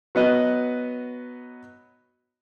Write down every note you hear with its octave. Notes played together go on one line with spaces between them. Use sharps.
F#3 B3 D#5 F#6